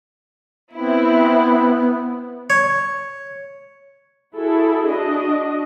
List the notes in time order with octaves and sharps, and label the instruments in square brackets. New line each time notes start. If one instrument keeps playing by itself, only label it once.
[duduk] B3 [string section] C4 E4
[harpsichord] C#5
[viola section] E4 F#4 G#4 A4
D4 F#4 D#5